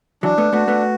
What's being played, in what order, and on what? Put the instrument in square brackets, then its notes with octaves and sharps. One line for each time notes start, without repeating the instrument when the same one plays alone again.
[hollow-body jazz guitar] E3 F#3 [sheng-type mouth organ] D4
[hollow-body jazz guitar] A3 B3
[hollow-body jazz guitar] A3 B3 [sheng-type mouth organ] F#4
[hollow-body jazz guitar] A3 B3